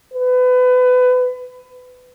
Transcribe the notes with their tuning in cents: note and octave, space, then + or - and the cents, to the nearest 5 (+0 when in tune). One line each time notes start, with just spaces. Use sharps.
B4 +25